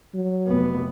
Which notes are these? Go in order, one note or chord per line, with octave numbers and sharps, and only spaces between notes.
F#3
F1 B3